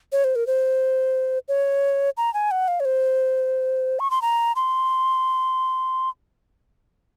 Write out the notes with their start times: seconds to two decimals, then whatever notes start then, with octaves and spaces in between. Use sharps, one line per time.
0.12 C#5
0.24 C5
0.36 A#4
0.47 C5
1.48 C#5
2.17 A#5
2.34 G#5
2.51 F#5
2.68 F5
2.80 C#5
2.85 C5
4.00 C#6
4.11 C6
4.22 A#5
4.56 C6